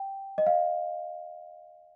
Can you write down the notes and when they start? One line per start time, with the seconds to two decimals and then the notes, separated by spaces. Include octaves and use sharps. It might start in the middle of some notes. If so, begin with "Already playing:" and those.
Already playing: G5
0.38 D#5
0.47 F5